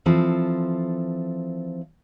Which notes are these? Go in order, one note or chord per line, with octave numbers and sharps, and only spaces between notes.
E3 F3 C4 A4 C5